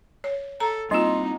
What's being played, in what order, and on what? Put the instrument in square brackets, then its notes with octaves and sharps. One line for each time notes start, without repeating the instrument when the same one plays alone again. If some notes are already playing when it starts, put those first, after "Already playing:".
[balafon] C#5
[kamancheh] A4 [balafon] A#5
[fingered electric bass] G3 C4 [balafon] A#3 F4 [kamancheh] D#4 [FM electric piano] D#5 C6